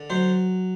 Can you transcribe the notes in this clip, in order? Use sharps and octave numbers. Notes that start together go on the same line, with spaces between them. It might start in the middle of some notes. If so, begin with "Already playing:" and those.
Already playing: D3
F#3 C5